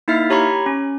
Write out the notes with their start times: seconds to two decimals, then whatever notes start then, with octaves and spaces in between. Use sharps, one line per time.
0.08 A#3 D#4 E4 E5 F6 C7
0.30 G4 C#5 A#5 B5 C#6
0.66 C#4